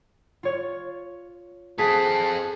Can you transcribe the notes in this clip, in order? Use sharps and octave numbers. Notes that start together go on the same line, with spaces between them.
F4 C#5
C4 G#4 A4 B6